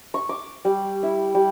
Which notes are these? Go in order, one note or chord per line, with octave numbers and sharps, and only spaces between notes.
C#6
D6
G3
E4
G3